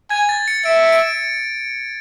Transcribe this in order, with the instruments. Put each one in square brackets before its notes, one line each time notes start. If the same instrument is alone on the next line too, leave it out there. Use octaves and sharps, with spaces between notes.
[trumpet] G#5 [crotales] G#6
[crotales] A6
C#7
[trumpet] E5 [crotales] D7
[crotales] D7